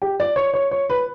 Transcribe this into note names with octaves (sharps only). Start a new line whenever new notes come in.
G4
D5
C#5
C#5
C#5
B4